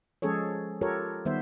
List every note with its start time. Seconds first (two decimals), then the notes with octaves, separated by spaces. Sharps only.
0.22 F3 G#3 C#4 G#4 A4 C#5
0.81 F4 G4 A4 A#4 C#5
1.25 D#3 G3 B3 C5 E5